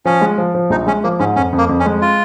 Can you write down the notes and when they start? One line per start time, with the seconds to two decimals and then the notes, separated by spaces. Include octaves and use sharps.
0.05 F3 C#4
0.21 G#3
0.38 F3
0.55 F3
0.70 A#1 D#4
0.87 G#3 C#4
1.04 F3 A#3
1.19 G#2 C#4
1.36 F2 C#4
1.53 F2
1.58 A#3
1.69 F2
1.80 C#4
1.86 G#3
2.02 F4